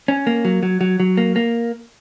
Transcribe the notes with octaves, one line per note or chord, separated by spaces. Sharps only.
C#4
A#3
F#3
F#3
F#3
F#3
A#3
A#3